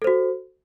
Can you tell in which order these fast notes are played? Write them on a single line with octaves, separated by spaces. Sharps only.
A4 C5 F#4